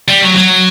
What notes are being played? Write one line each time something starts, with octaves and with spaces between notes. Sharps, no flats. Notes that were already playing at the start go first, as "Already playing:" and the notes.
G3
F#3
F#3